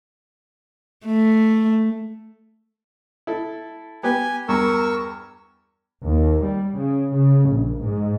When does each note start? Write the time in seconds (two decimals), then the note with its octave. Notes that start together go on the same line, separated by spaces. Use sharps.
1.06 A3
3.27 E4 A4
4.03 B3 G4 B4 G#5
4.49 E2 G2 A#4 C#6 E6
6.05 D#2
6.45 G3
6.76 C#3
7.14 C#3
7.49 A#1
7.83 G#2